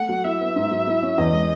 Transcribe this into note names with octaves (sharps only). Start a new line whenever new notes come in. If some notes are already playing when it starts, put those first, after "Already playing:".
Already playing: A3 F#5
F#3
E4 E5
B3
G#2
F#3
E4
C#4
E2 D#5
G#3